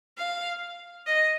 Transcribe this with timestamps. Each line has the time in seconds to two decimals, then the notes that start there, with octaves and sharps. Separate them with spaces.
0.18 F5
1.07 D#5